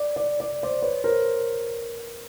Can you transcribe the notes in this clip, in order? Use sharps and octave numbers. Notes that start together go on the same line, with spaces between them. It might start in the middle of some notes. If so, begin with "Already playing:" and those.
Already playing: D5
D5
D5
C5 D5
B4 C#5
A#4 C5